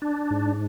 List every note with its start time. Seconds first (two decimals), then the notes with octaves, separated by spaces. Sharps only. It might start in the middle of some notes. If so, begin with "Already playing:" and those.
0.02 D4
0.31 G#2